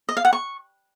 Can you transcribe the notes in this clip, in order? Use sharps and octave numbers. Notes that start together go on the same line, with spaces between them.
D#5
F5
F#5
C#6